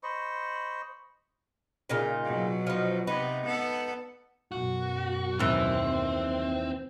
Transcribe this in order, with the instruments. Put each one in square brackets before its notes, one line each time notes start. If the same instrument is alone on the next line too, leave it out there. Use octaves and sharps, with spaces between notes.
[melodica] C5 D#5 B5 C#6
[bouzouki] A#2 C#3 D#4
[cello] B2 F#3
[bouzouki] F3 D#4
[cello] C3 B3 [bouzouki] D#4 B4
[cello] B3 A4
[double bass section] F#2 B2 [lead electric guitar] F#4
[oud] D#2 E3 [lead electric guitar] C4